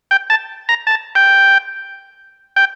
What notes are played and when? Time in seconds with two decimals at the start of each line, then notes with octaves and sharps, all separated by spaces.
0.11 G5
0.30 A5
0.69 A#5
0.87 A5
1.15 G5
2.56 G5